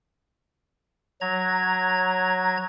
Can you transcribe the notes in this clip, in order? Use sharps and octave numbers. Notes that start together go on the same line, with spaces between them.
F#3 A#5 G#6